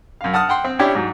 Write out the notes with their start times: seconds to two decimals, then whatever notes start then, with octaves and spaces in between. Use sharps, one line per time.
0.21 F#2 F5
0.33 F#5 A5 D#6 F6
0.49 F#5 G5 C6
0.64 C4
0.79 C#4 D4 E4 G4 C#5 D5
0.95 G#2 F#3